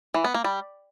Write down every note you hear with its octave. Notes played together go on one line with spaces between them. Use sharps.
E3
B3
A#3
G3